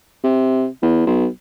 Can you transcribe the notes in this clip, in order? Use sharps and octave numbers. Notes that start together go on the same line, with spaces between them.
C3
E2
B1